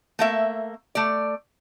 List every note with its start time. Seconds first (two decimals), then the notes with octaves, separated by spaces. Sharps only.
0.19 A3 A#3 E5
0.95 A3 D5